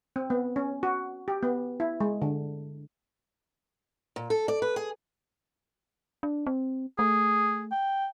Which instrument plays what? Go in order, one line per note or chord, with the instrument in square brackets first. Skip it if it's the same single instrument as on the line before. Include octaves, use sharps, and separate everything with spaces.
[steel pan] C4
B3
C#4
F#4
G4
B3
E4
G#3
D3
[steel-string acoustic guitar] A#2
A4
D5
B4
G#4
[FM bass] D4
C4
[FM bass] A3 [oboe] G#4
[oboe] G5